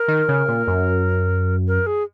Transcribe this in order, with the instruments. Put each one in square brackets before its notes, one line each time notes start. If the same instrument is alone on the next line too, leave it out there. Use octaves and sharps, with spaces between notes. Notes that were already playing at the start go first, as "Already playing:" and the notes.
Already playing: [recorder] A#4
[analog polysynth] D#3
C#3
A#2
F#2
[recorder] A#4
G#4